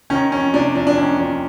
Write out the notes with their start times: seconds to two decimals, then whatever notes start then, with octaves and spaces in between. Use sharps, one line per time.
0.10 D#3 C#4
0.32 F2 C#4
0.53 C3 D4
0.75 F2 D4
0.87 D4
0.97 D#3 C#4
1.19 F2 D4